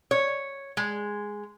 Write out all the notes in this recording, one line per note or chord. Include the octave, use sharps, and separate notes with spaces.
C#5
G#3